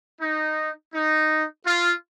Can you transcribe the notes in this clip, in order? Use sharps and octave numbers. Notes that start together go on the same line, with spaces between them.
D#4
D#4
F4